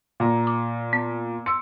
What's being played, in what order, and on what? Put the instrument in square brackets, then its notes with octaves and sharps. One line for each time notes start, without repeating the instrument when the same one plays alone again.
[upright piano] A#2 A#5
[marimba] D6
B3
[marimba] C6 E6 [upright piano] C#7